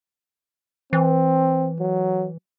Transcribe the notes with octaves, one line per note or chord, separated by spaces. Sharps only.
E3 C4
F#3